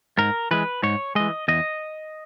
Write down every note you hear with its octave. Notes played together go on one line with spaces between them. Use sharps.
G#2 A#4
E3 G#3 B4
G#2 C#5
E3 G#3 D#5
E2 D#5